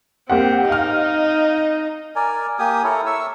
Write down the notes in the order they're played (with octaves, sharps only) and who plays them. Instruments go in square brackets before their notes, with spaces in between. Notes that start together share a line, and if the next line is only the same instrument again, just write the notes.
[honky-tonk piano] A#3 G4 F#5 [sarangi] C4
[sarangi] D#4 [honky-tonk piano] F5 F6
[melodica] A#4 D5 G#5
A#3 G4 G#5 D#6
E4 A4 A#4 C#5
C#5 E5 C#6 E6